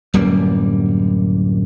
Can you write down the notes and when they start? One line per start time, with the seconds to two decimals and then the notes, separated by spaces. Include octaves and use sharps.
0.14 D1 F#2 G3 A#3